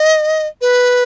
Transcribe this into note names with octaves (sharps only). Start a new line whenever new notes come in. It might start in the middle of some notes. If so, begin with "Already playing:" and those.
Already playing: D#5
B4